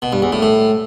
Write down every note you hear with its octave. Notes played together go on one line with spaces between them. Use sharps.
B2
G2
E2
A2
A2